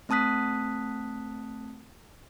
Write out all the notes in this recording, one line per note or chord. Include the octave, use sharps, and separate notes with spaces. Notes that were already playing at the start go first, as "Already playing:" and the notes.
A3 C4 A5 D#6 F#6 B6